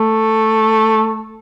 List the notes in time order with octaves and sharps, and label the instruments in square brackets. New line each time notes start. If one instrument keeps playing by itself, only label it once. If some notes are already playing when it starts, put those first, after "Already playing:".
Already playing: [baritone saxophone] A3